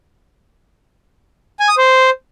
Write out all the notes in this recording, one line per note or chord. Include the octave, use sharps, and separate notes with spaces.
G#5
D#6
C5